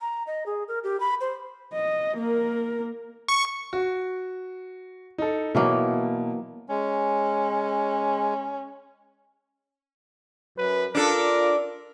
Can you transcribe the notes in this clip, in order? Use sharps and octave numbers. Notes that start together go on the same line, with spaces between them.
A#5
D#5
G#4
A#4
G4
B5
C5
D#5
A#3 A#4
C#6
F#4
D#4 A4
B2 E3 F#3 A#3
G#3 C#4
F#2 B4
D4 F4 A4 A#4